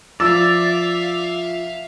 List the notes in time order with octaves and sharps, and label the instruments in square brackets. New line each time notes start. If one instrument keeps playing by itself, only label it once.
[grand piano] F3 [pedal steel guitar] D5 [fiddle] E5 F5 [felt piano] E6